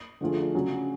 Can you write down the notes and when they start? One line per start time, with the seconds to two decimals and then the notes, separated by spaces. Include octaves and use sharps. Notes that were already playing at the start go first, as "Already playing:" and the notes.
0.21 D3 F3 A3 F4 G#4
0.55 C#3 F#3 C#4